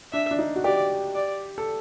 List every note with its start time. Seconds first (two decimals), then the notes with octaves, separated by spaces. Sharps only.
0.13 D4 E5
0.31 D4
0.39 D#4
0.56 F#4
0.64 G4 D5
1.15 D5
1.58 A4